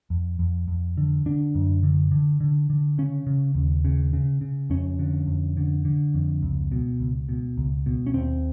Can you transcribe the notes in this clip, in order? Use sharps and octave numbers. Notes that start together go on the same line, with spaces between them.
F2
F2
F2
D3
D3 D4
F#2
D3
D3
D3
D3
C#3 C#4
C#3
D#2
C#3
C#3
C#3
F2 C#4
D3
F2
D3
D3
F2
C#2
B2
C#2
B2
C#2
B2
C#4
D#2 C4